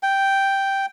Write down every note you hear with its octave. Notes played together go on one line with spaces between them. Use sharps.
G5